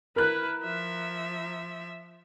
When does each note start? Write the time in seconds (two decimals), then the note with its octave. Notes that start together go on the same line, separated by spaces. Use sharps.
0.16 E4 A#4 B4 F#6
0.64 F3 E5